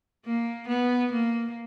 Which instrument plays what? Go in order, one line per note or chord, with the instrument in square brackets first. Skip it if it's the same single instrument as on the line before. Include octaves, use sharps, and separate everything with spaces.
[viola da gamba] A#3
B3
A#3